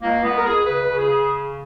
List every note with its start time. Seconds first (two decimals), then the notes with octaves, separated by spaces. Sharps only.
0.02 C#2 A#3
0.23 C#2 B3
0.37 A#4
0.44 C#2 G#4
0.65 C#3 B4
0.88 C#3
0.98 G#4
1.09 C#3